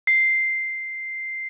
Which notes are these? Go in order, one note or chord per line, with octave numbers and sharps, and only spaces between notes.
C7